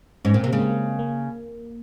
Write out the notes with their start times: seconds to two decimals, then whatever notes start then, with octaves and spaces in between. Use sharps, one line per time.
0.25 G#2 C#4
0.34 A#2 C4
0.43 C3 A#3
0.53 C#3 G#3
0.61 A#3
0.99 A#3